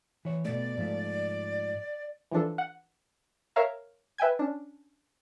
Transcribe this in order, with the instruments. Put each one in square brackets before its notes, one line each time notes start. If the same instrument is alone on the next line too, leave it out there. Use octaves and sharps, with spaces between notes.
[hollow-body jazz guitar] E3 C#5
[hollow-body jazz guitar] B2 A3 [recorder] D5
[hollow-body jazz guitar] G#2 F3 A3
[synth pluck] E3 F3 D4 A4
F#5
A#4 C#5 E5 F5 A#5
B4 E5 G5 G#5 G#6
C#4 D4